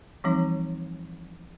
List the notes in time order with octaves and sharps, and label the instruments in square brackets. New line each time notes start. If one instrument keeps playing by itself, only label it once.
[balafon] E3 F3 G3 C4 D#4